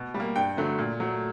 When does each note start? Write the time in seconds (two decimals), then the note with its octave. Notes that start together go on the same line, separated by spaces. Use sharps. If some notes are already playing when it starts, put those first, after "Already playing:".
Already playing: B2
0.14 G3
0.20 A#3
0.36 G2 G5
0.57 D3 F#3 A3
0.78 A#2
1.00 F#3 A3